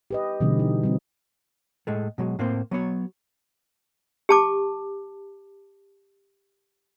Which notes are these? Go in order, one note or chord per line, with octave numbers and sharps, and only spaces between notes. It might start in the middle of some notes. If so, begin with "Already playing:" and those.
G4 B4 D#5
B2 D3 E3 G3 B3 C#4
D#4
G3 C4 E4
A2 G#3 A3
B2 F#3 G#3
A2 A#3 C4 C5
F#3 B3 C#5
G4 A5 D6